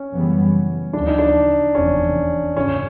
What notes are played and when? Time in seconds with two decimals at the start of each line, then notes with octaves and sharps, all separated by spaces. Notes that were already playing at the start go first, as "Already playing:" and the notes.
Already playing: C#4
0.12 F#2 C#3 E3 G3 B3
0.93 D2 C#3 F3 D4
1.07 D#4
1.18 D4
1.75 F1 E2 C3 E3 C#4
2.56 G#1 F#2 C#3 C#4